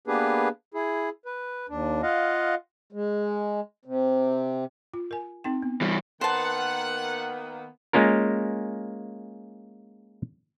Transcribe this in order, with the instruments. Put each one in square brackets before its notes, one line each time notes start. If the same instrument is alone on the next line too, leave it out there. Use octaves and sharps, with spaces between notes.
[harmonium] A#3 B3 D4 G4 G#4 B4
E4 G#4
B4
D#2 D4
F4 D#5 F5 F#5
G#3
C3
[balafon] F4
A#4 G#5
C4 D#4 G5
B3
[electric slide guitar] E3 G3
[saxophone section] D#3 A#3 B3 [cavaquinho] C5 A5 [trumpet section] F#5
[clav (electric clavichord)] G#3 A#3 C#4 F4 A#4